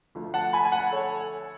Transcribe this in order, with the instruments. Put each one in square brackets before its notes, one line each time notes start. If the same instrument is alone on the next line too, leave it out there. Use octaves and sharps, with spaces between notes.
[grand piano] D2 D3 F3
F#5 A5
G#5 B5
G#5
F#5 A5
A4 C#5